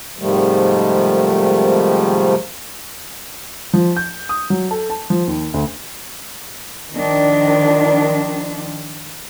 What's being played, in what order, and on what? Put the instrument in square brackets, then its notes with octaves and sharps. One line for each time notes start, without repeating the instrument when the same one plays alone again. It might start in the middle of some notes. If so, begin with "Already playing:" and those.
[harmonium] G#2 C3 D#3 F3 G3 A3
[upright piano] F3
G6
D#6
F#3
A4
A5
F3
D#2
D2
[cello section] D#3 F3 D4